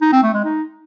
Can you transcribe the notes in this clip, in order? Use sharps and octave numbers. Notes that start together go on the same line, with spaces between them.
D#4
C4
A3
G#3
D#4